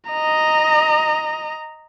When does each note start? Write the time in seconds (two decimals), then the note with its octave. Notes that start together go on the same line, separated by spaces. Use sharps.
0.11 D#5 A#5